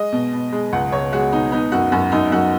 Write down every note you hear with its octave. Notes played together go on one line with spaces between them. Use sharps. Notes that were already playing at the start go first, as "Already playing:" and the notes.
Already playing: G#3 D#5
B2
B2
G#3
C#2 F#5
C#2 C#5
G#3 F#4
B2 D#4
B3 D#4
F#2 F#4
F#2 F#4
F#2 D#4
F#2 F#4